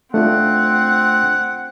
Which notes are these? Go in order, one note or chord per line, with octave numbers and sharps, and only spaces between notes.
A3 C4 D4 F4 F#5